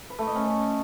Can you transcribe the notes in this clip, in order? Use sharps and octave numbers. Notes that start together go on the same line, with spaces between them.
B4
A3
D#5
C#4
C#5